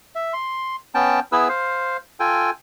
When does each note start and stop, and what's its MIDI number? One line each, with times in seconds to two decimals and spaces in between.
0.15 0.33 76
0.33 0.76 84
0.95 1.20 59
0.95 1.20 61
0.95 1.20 79
0.95 1.20 81
1.32 1.48 59
1.32 1.48 64
1.32 1.48 68
1.32 1.48 71
1.32 1.48 88
1.49 1.97 72
1.49 1.97 77
2.20 2.50 65
2.20 2.50 69
2.20 2.50 79
2.20 2.50 80